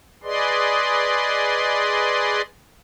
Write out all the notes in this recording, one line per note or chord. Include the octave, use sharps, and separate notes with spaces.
G#4 B4 D5 D#5 C6